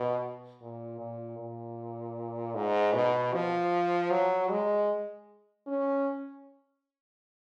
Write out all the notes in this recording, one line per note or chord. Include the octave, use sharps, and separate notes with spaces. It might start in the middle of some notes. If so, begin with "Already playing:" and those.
Already playing: B2
A#2
A#2
A#2
G#2
B2
F3
F#3
G#3
C#4